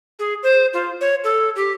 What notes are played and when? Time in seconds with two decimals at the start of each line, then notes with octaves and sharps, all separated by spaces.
0.19 G#4
0.43 C5
0.73 F4
1.01 C#5
1.24 A4
1.56 G4